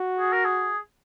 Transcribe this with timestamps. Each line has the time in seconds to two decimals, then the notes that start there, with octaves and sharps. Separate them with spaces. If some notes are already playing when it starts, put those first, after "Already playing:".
Already playing: F#4
0.19 G#4
0.33 A#4
0.45 G#4